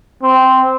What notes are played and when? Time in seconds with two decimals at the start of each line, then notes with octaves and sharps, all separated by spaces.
0.23 C4